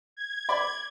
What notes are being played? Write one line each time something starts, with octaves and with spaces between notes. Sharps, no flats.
G#6
D5 B5 D6